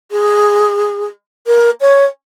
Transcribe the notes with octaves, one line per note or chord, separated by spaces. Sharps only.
G#4
A#4
C#5